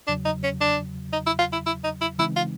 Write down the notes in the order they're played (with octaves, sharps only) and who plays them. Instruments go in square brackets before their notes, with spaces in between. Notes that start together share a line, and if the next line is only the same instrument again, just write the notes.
[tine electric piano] E2 C#3 F#3 [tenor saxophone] D4
[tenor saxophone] D#4
C#4
D4
D#4
E4
F4
E4
E4
D#4
E4
[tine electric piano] C#3 E3 G#3 C4 D#4 [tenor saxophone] E4
[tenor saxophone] F4